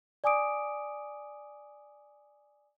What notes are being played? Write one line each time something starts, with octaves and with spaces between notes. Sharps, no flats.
D5 G#5 D6 D#6 D7